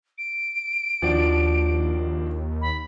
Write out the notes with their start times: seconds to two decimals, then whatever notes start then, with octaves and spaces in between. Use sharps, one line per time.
0.18 D7
1.02 D#2 F3 D4 F#4
2.61 B5